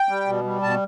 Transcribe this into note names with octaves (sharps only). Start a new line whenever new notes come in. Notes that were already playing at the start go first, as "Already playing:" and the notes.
Already playing: G5
G3
B2
G3
B2 A5